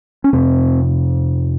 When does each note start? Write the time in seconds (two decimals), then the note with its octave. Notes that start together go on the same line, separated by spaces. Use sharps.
0.24 C#4
0.33 F2 C3 C4